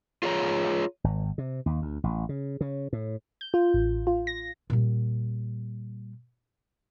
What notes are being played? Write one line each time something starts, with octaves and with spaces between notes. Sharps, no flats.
F4 G#4 C#5 A#5
G#1
C3
D#2
D2
A1
C#3
C#3
A2
G6
F4
A1
F4
A#6
A#2 G3